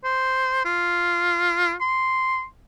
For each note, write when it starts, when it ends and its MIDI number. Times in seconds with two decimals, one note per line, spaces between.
0.04 0.61 72
0.65 1.74 65
1.81 2.44 84